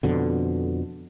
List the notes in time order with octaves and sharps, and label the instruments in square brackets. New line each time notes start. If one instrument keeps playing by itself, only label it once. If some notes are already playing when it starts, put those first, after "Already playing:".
[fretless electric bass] F2 B2 D3